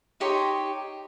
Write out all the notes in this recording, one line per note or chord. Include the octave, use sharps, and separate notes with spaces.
D#4 G4 C#5 C6